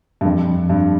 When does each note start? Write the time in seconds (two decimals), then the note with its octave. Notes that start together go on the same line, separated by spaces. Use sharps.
0.21 G2
0.25 F2
0.70 G2